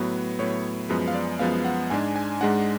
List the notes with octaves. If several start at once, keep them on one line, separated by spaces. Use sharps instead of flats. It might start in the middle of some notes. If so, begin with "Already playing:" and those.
Already playing: A2 F#3 B3 B4
A2 F#3 B3 C#5
F#2 F3 G#3 B3 B4
F5
D5
F#2 F3 G#3 B3 F5
F#5
G#2 G#3 D4 G#5
G#5
G#2 G#3 D4 F#5